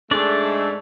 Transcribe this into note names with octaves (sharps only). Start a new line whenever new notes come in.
G#2 G#3 A3 D4 D5